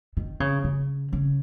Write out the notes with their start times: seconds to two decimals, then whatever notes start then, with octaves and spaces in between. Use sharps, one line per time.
0.17 D#3
0.40 C#3
0.64 C#3
1.13 C#3